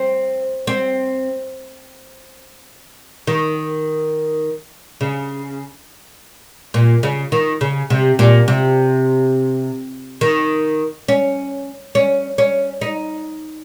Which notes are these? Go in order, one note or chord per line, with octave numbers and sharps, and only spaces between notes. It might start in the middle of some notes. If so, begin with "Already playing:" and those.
Already playing: C4
C4
D#3
C#3
A#2
C#3
D#3
C#3
C3
A#2
C3
D#3
C#4
C#4
C#4
D#4